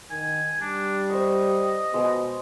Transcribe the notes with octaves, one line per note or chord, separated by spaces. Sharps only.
D#3 G#5
G3 D4
C5 D#5 C#6
B2 G#3